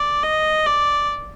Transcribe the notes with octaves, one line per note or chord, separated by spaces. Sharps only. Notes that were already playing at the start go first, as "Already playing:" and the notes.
Already playing: D5
D#5
D5